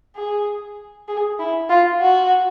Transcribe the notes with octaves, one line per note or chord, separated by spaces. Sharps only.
G#4
G#4
E4
F4
F#4